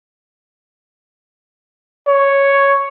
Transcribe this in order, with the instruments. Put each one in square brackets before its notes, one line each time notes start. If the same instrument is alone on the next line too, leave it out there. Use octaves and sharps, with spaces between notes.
[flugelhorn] C#5